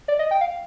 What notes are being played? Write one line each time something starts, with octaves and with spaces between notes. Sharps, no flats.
D5
D#5
G5
F5